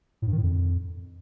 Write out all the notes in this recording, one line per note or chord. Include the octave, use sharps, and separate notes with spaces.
A2
G2
D#3
A2
F2